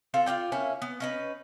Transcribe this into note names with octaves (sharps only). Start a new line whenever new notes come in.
C4 F4 A4
F4 G4 D5 G5
A#3 C#4 E4
B3
C#4 D#4 B4